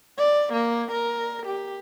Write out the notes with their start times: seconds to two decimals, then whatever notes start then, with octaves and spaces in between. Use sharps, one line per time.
0.18 D5
0.53 A#3
0.91 A#4
1.46 G4